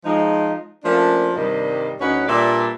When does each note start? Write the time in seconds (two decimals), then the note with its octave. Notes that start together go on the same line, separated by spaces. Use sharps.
0.04 F3 G#3 D#4
0.84 F3 A3 A#3 C#4 D4
1.36 G2 C3 D#3 G3 D#5
2.00 D2 C#4 D#4 B4 C#5 F#5
2.28 A#2 G3 D4 B4 D5 E5